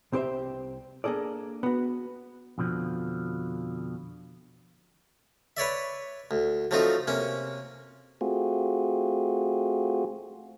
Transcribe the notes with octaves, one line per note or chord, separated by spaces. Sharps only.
C2 C4 G4 C5 E5
A#3 D4 G#4 A4 D5
B3 F#4
F2 B2 D3 F3
B4 C#5 D5 E5
D2
F3 F#3 A3 C4 D#4 F4
C3 A#3 C#4
A3 C4 F4 F#4 G#4